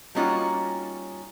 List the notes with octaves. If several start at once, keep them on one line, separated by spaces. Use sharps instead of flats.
G3 A#3 C#4 D#4 F4 F#4